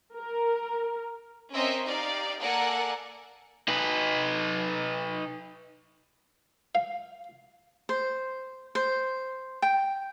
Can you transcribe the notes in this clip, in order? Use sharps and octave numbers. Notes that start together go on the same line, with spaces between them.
A#4
C4 C#4 A#4 C5 D#5 E5
D#4 G4 D5 F5
A#3 A4 A#4 D5 F#5 G#5
D#4 B4
F5
C5
C5
G5